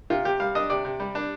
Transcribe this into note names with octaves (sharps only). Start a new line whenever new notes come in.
C3 F4
C3 G4
G3 F5
D4 D#5
C3 D5
C3
G3
D4